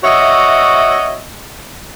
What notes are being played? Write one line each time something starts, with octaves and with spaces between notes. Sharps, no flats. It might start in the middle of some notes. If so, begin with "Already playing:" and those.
F#4 C#5 D#5 E5